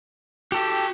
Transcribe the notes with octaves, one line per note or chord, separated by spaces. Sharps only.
F#4 G4 A4 G5